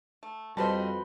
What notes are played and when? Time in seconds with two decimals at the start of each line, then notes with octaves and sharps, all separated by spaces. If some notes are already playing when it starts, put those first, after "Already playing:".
0.23 A3
0.57 F2 G3 F#4 B4 C5 D#5 A5